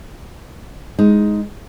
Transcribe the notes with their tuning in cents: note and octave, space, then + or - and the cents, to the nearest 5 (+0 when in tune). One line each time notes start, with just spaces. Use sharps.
G#3 +0 D#4 +10